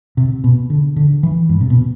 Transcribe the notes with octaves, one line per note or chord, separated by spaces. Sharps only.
C3
B2
D3
D3
E3
G2
C3
B2